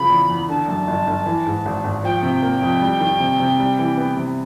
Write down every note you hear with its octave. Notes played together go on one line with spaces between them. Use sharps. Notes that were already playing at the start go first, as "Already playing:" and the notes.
Already playing: C#3 F3 B5
E2
E2
D3 A5
F#2
G1
G1
E3
G#2
G#1
G#1
F3 G5
C3
A#3
F2
G3
D#3
C3
C3
G3
E3
B3
C3